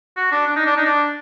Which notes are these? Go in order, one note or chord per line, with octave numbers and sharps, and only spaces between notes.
F#4
D4
D4
D#4
D4
D#4
D4